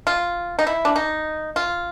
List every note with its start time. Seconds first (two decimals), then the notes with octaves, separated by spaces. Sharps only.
0.07 F4
0.59 D#4
0.67 E4
0.85 D4
0.96 D#4
1.56 F4